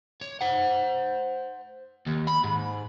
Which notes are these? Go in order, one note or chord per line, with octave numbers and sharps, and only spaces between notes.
C#5
C5 F#5
D#2
B5
G#2